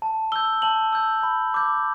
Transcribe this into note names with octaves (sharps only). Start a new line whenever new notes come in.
A5
E6 G6 G7
A5 F#7
E6 G6
B5
D6 G6